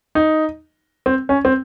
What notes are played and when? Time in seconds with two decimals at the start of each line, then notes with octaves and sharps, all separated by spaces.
0.15 D#4
1.06 C4
1.29 C#4
1.45 C4